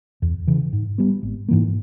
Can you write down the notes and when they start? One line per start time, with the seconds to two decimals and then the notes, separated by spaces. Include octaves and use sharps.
0.22 E2
0.47 C#3 E3
0.73 G#2
0.98 G3 B3
1.23 G#1
1.48 G#2 E3 A#3